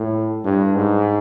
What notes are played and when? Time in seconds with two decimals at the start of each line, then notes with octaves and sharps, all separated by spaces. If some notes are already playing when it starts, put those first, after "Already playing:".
Already playing: A2
0.44 G2
0.75 G#2